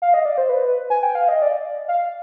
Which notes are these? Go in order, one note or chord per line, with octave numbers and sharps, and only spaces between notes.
F5
D#5
D5
C5
B4
G#5
G5
F5
D#5
D5
F5